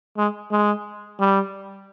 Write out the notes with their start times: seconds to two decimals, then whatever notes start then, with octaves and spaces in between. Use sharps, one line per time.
0.17 G#3
0.51 G#3
1.19 G3